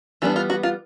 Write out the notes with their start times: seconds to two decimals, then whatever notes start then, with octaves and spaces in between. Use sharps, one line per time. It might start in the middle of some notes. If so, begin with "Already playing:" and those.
0.22 E3 G3 B3 D4 F4
0.36 F4
0.50 F#4
0.63 F4